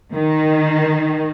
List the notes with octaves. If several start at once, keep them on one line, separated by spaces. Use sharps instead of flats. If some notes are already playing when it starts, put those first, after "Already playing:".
D#3